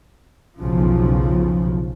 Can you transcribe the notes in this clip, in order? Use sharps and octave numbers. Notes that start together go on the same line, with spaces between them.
B1 E2 C#3 F3